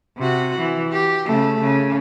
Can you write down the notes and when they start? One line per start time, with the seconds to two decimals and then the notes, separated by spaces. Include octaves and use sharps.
0.18 C3 F#4
0.58 E3
0.92 G4
1.26 C#3 A3
1.60 C#3